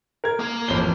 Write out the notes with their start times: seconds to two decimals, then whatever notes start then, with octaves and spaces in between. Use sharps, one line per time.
0.24 A#4 G#6
0.39 A#3 A#5
0.68 A1 F2 G7